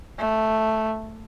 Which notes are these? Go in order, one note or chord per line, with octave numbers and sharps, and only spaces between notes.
A3